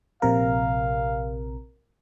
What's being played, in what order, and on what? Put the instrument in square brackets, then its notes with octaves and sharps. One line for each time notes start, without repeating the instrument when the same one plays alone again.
[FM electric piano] A#1 C3 A#4 [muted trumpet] F5